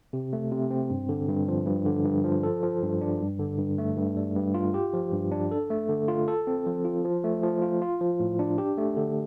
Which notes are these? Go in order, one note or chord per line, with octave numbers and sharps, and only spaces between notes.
C3
A3
C3
C4
G2
D3
G2
F3
G2
D3
G2
F3
A4
F3
G2
D4
G2
D3
G2
A3
G2
G3
G2
F4
G4
F3
G2
D4
A4
A3
D3
F4
A4
C4
F3
F4
F3
A3
F3
F4
F4
F3
A2
D4
G4
A3
D3